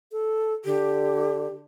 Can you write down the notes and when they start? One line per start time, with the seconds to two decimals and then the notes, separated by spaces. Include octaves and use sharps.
0.12 A4
0.65 D3 G4